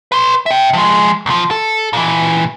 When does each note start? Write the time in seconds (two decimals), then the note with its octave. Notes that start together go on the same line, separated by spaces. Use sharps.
0.12 B4 C6
0.46 E5 G5
0.73 F3 G#3
1.26 B1 F3
1.51 A4
1.93 A#2 E3